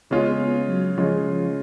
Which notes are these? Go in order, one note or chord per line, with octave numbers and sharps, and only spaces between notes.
C#3 G#3 B3 C#4 F4
B3
F#3
C#3 F3 G#3 C#4 F4
F3